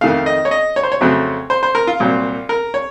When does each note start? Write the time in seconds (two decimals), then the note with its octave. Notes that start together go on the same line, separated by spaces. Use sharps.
0.01 F2 D#3 A3 F5
0.26 D#5
0.45 C#5
0.51 D#5
0.76 C#5
0.83 C5
0.92 C#5
1.01 F2 C#3 F#3 A3 C4
1.50 C5
1.63 C5
1.75 A#4
1.87 F4
2.00 C2 A#2 F#3 C4
2.49 A#4
2.74 C#5